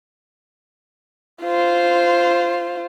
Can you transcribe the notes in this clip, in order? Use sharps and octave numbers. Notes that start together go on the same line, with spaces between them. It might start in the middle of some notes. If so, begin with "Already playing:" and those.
F4 C5